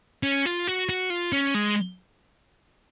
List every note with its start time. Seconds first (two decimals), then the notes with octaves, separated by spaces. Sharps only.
0.23 C#4
0.46 F4
0.67 F#4
0.89 F#4
1.10 F4
1.33 C#4
1.54 G#3